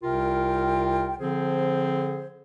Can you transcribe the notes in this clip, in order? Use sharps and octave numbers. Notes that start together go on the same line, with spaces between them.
C2 C3 F4 A#4 G5
D3 F3 C4 G#4 C5